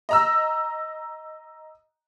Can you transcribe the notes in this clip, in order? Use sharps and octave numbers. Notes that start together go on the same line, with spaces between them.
D#5 A#5 E6